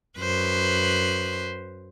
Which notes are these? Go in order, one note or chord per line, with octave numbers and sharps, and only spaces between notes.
F#2 B4 C5